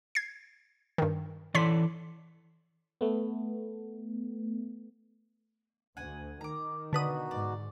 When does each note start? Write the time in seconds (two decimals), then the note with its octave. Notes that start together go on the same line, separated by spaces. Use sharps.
0.15 G#6 C7
0.98 G2 D#3
1.55 E3 A4 C#5 D5 C6 B6
3.01 A3 B3
5.97 D2 F#5 G#5
6.41 D#3 A#5 D6
6.93 B2 D3 D#4 F#4 B4 D#6
7.31 G#2 D5